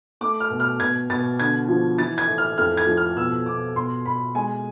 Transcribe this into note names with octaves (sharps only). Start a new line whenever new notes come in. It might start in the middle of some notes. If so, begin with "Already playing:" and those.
A3 D6
F6
B2
F6
B2 G#6
B2 A6
D3 G#6
F3
E3 A6
G#6
A2
F6
F2 F6
G#6
F3
F6
B2 E6
B2 D6
B2 C6
B2 B5
G#3 G#5